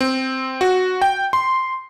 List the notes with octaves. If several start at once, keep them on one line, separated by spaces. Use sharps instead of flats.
C4
F#4
G5
C6